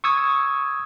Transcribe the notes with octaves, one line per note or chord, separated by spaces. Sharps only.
C#6 D#6 E6 G#6